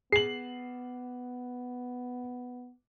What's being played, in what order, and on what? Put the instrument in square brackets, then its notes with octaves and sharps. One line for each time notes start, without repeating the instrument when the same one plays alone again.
[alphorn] B3 [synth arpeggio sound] G#4 [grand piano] C7 F#7